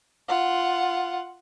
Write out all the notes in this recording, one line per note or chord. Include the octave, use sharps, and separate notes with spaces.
F4 F#5